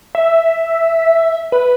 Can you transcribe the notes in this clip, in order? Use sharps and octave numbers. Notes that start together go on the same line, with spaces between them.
E5
B4